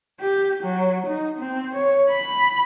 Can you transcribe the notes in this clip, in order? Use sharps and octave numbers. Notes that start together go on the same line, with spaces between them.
G4
F#3
D#4
C4
C#5
B5